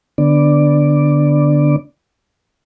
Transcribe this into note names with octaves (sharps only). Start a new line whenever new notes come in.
D3 B3 D4 D5